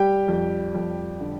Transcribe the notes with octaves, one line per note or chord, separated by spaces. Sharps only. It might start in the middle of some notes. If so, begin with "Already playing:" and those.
Already playing: G3 G4 G5
F2
F2
D3